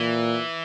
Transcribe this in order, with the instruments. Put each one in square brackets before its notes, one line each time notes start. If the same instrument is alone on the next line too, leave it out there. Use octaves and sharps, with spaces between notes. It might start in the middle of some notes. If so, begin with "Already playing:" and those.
Already playing: [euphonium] A#2 [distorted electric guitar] E3